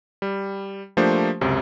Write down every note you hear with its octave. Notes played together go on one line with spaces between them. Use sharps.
G3
F3 A3 A#3 D4 G4 C5
C#2 F#2 C3